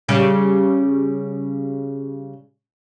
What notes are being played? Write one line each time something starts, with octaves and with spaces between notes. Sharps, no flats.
C#3 G3 C#4